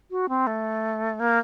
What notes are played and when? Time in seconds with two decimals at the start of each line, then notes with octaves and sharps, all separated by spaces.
0.11 F#4
0.29 C4
0.47 A3
1.20 A#3